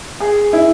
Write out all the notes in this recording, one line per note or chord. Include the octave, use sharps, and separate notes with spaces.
G#4
E4